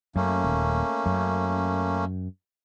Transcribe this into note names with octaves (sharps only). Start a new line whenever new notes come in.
F#2 A3 A#3 C#4
D#1
F#2